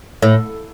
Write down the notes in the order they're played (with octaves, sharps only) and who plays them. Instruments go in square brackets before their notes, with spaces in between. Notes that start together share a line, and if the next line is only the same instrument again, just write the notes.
[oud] A2